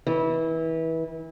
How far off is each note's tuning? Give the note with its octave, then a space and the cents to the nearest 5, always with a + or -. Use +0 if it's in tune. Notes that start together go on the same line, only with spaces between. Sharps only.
E3 -25